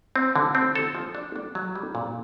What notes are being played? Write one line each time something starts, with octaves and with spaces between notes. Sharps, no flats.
C4
D3
C4
A4
F3
D4
D4
F#3
G3
A#2